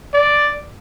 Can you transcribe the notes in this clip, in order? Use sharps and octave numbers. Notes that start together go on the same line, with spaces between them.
D5